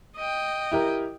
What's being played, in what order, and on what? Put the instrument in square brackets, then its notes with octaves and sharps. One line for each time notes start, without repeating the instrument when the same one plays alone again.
[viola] D#5 G5
[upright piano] E4 G4 A#4